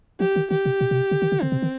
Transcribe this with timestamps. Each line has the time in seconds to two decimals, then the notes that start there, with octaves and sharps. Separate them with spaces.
0.20 F3 G4
0.36 D#3
0.50 D#3 G4
0.65 C3
0.81 B2
0.91 B2
0.96 C3
1.11 D3
1.22 D#3
1.32 D3
1.42 D3 C4
1.52 C3
1.62 D#3